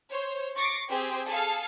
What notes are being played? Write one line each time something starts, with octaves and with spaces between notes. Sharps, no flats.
C5 C#5
C#6 D6 A6 A#6 C7 D7
C4 G4 G#4
G#4 A4 F5